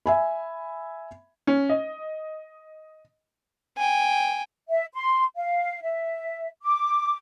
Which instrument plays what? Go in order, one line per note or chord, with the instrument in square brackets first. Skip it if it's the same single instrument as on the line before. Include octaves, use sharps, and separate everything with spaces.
[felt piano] E5 G#5 B5
[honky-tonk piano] C#4
D#5
[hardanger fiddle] G5 G#5
[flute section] E5
C6
F5
E5
D6